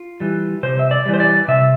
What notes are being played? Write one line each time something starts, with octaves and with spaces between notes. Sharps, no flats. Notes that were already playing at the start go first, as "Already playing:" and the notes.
Already playing: F4
E3 G3
C3 C5
E5
D5
E3 G3
C5
D5
C3 E5